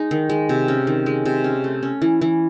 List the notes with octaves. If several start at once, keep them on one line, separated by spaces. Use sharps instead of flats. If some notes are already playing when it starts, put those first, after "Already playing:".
Already playing: G#3 D#4
D#3
G#3
C3
C#4
D#3
G#3
C3
C#4
A3
C#4
E3
E3